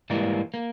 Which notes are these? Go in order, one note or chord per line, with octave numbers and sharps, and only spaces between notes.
G#2 E3 G3 A#3
A#3